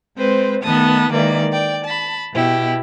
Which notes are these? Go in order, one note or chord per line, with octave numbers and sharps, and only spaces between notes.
G#3 C4 B4 C5
D#3 A3 B3 A5 D#6
D#3 E3 G#3 A#3 D5
D5 G5
A5 B5
B2 E4 G4